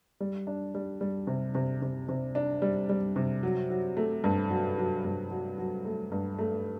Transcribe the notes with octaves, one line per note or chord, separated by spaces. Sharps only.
G3
D4
G3
G3
C3
C3
C3
C3
D4
G3
G3
C3
F#3
F#3
A3
G2
F#3
F#3
G2
F#3
F#3
A3
G2
A3